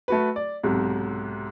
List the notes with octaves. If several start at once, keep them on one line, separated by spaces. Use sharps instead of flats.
A3 F#4 B4
D5
B1 G#2 C3